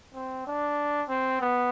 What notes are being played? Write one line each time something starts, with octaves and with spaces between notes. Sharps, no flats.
C4
D4
C4
B3